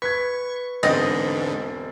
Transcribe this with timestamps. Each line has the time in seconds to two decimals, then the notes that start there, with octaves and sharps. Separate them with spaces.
0.02 B4 C#6 G#6 B6
0.83 E1 G#2 D3 E3 C4 D#5 A6